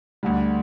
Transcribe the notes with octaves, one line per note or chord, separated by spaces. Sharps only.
D2 D3 G3